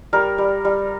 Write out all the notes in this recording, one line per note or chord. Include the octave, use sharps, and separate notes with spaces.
G3 A#4
G3
G3